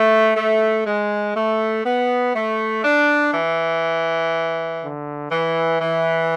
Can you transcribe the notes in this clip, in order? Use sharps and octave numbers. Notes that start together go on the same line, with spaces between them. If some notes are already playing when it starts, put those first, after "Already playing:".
Already playing: A3
A3
G#3
A3
B3
A3
D4
E3
D3
E3
E3